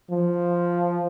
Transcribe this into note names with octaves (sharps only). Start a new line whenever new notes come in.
F3